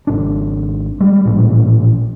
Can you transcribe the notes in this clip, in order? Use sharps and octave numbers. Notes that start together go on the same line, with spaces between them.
G#1 D4
G3 G#3
A1 A#2